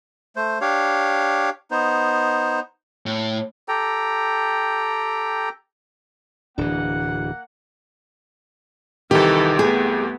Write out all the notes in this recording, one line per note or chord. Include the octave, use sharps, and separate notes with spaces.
A3 C5
D4 G4 C#5 F5
B3 D#4 C5
A2
G4 A4 G5 A#5
D1 E3 A#3 D4 F#5
C2 D#3 E3 G4 A4
A3 B3 G#4